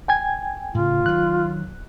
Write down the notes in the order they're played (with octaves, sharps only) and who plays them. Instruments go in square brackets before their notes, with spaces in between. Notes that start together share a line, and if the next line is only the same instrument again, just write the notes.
[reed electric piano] G5 G#5 G#6
[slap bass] A2 C#3 [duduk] F4
[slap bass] D#3 F#3 [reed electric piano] F#6